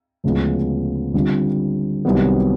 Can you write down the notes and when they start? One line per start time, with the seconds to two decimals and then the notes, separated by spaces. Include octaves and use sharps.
0.24 D2 C#3 F3 G#3 B3
1.14 D3 G3 C4 F4
2.05 C2 C3 D#3 F#3 B3